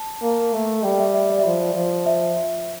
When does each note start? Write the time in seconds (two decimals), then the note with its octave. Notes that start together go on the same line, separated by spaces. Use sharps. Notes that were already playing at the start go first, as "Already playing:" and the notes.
Already playing: A5
0.22 A#3
0.54 A3
0.84 G3 G5
0.99 E5
1.13 E5
1.30 D5
1.39 E5
1.45 F3 D5
1.75 F3
2.06 E5